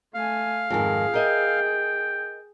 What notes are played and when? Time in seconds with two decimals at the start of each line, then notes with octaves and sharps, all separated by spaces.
0.14 A3 F5 G#5
0.70 F2 G#2 D#3 G#4
1.14 A#4 D#5 E5 G5